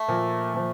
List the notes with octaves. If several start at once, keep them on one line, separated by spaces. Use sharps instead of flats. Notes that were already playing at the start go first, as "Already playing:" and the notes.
Already playing: A3
A#2 F3 A#3
A#2 F3